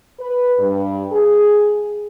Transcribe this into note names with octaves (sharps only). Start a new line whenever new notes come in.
B4
G2
G#4